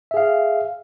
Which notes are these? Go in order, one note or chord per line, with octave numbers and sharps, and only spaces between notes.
G#4 E5 F5